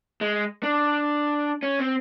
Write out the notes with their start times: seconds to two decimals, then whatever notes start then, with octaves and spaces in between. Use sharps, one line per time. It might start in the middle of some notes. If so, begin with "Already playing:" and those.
0.21 G#3
0.63 D4
1.63 C#4
1.79 C4